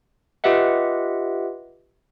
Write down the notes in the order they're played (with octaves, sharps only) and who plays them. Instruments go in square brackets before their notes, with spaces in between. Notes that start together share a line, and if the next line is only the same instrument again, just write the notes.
[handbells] F4 G4 B4 D#5 E5 F#5